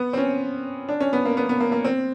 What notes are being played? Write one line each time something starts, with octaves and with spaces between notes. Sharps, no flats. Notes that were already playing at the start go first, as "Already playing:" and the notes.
Already playing: B3
C4
C#4
D4
C#4
B3
A#3
B3
B3
A#3
A#3
C4